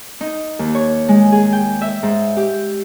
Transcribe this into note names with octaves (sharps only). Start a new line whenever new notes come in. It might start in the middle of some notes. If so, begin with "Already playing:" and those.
D#4
D#2
C#5
G#3
G#4
G5
E5
G#2
G4